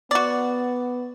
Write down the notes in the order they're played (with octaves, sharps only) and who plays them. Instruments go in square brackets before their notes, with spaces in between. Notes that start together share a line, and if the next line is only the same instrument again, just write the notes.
[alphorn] B3 [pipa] F#4 D5